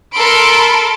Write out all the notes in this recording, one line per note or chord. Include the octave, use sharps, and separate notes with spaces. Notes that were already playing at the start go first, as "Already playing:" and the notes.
A4 A#4 B5 C6 D7